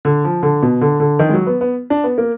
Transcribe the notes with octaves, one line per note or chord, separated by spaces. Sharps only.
D3
F3
D3
B2
D3
D3
D#3
G#3
F#3
B3
B3
D4
B3
A#3